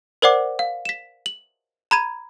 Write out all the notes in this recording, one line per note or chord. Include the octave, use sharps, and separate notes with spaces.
A#4 C5 D5 F#5 D6
F5
B6 E7
F#7
A#5 B5 G#6 D#7